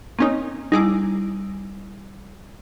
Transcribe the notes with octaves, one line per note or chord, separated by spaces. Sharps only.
A#3 C4 C#4 D#4
G3 D#4 E4 G#4 D6